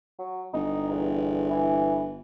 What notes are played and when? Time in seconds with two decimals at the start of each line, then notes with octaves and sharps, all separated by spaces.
0.19 F#3
0.54 G1 D#4
0.91 E2
1.50 E3